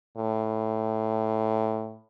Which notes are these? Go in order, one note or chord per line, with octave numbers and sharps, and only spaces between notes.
A2